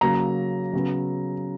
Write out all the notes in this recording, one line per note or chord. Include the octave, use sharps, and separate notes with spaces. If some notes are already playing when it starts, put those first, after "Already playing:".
C#3 F#3 A#3 A#5
C#3 F#3 B3